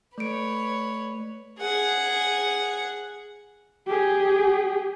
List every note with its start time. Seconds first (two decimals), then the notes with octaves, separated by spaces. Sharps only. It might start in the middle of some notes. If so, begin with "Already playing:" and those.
0.18 A3 B4 C#5 D7
1.59 G#4 F#5
3.87 G4 G#4